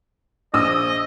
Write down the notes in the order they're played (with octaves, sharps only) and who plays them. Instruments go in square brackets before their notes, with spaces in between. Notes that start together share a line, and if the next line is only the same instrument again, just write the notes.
[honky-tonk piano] A#1 D#6 E6 [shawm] D#5